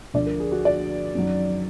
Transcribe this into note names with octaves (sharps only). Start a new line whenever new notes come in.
D2 D3 F3 D5
A#4
G#4
F#4
D5
F#2 D#3 F#3